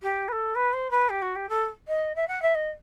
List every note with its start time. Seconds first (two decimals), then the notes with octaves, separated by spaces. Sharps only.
0.02 G4
0.28 B4
0.32 A4
0.55 B4
0.73 C5
0.90 B4
1.09 G4
1.21 F#4
1.35 G4
1.49 A4
1.87 D#5
2.15 E5
2.27 F#5
2.42 E5
2.54 D#5